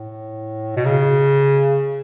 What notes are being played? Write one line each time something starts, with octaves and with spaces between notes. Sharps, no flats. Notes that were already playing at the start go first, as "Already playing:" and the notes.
Already playing: A2
B2
C#3